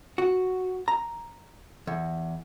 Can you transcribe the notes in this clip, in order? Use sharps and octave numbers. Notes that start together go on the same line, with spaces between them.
F#4
A#5
E2